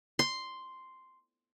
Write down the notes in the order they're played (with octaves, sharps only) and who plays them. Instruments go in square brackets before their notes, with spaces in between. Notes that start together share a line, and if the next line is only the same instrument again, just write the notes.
[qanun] C6